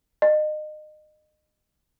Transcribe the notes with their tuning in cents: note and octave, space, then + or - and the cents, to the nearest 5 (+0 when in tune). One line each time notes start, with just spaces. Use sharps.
D#5 -30